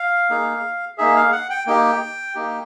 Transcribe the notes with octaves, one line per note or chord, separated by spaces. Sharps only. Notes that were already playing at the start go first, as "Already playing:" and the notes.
Already playing: F5
A#3 D#4 G#4
A#3 D#4 G#4 E5
F5
F#5
G5
A#3 D#4 G4 G5
A#3 D#4 G4